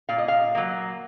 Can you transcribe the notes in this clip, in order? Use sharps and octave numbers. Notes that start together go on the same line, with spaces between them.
A#2 F5
D#5
F5
F#3 A#3